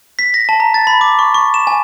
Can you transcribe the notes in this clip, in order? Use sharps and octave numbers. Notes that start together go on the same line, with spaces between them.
B6
A#6
A5
A#5
A6
B5
D6
C#6
C#6
E7
G#5